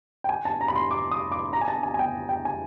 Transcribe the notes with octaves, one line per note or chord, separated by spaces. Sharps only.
G5
G#5
A5
A#5
B5
C6
D6
D#6
D6
A#5
G#5
A5
G#5
G#5
G5
G5
G#5